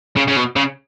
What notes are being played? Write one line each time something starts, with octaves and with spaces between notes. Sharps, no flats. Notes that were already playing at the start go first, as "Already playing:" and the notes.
C#3
C#3
B2
C#3